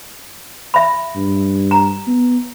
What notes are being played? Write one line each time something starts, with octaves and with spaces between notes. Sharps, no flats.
E5 B5
G2
A#5
B3